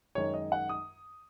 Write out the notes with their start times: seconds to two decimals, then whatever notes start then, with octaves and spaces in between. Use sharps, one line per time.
0.15 F#2 D#3 G#3 C#5
0.34 D#5
0.52 F#5
0.69 D#6